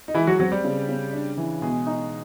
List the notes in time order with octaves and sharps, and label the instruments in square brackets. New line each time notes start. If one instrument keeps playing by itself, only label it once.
[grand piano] D#4
[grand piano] E3 E4 [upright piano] G#3
[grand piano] F#3 F#4
[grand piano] F#3 F#4 [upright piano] C4
[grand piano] G3 G4
[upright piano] C#3
C#3
D4
E3
[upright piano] B2 [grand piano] G#3 G#4
[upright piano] D#4